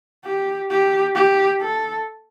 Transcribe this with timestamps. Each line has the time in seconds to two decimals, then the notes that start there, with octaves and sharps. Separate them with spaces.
0.25 G4
0.70 G4
1.15 G4
1.61 A4